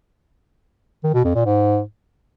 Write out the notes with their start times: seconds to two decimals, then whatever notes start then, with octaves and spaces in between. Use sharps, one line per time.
1.04 D#3
1.14 B2
1.24 F2
1.35 A#2
1.45 G#2